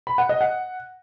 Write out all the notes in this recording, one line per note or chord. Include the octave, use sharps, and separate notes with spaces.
B5
F#5
D#5
F#5